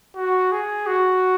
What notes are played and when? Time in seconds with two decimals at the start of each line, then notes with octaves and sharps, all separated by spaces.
0.15 F#4
0.52 G#4
0.87 F#4